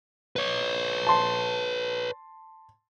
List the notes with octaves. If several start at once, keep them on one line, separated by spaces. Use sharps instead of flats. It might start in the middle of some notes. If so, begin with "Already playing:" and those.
B4 C#5
A5 C6